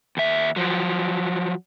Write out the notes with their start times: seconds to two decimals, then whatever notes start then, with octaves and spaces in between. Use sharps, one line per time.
0.17 D#2 E5
0.56 F3 F#3